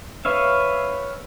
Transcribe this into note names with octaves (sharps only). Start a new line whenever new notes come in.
B4 C#5 E5 F5